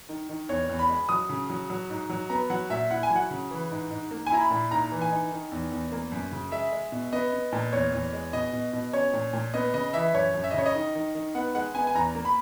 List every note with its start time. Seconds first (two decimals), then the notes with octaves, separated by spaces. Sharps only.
0.09 D#3
0.29 D#3
0.49 E2 C#5
0.69 E2
0.79 B5
0.89 G#3
1.09 F#3 D#6
1.29 C#3
1.50 F#3
1.70 F#3
1.90 G#2
2.10 F#3
2.30 B3 A#5
2.50 F#3 F#5
2.70 A#2 E5
2.91 E4 F#5
3.03 G#5
3.10 F#3
3.16 F#5
3.30 C#3
3.51 E3
3.71 G#2
3.91 G#2
4.11 A#3
4.27 G#5
4.31 E4 A#5
4.41 B5
4.51 A#2
4.71 G#2 A#5
4.92 E3
5.02 G#5
5.11 D#4
5.31 D#3
5.52 E2
5.72 E2
5.92 A#3
6.12 F#2
6.32 C#3
6.52 G#3 E5
6.72 G#3
6.92 B2
7.13 B3 D#5
7.33 B3
7.52 A#2
7.72 E2 C#5
7.93 E2
8.13 G#3
8.33 B2 D#5
8.53 B2
8.73 B2
8.93 C#4 C#5
9.13 A#2
9.33 A#2
9.54 B3 D#5
9.74 C#3 D#5
9.93 E3 E5
10.14 F#2 C#5
10.34 F#2
10.44 E5
10.51 D#5
10.54 C#3 C#5
10.66 D#5
10.75 D#3
10.95 D#3
11.15 D#3
11.35 B3 F#5
11.55 G#3 F#5
11.75 B3 G#5
11.87 G#5
11.95 E2 A#5
12.15 A#3
12.25 B5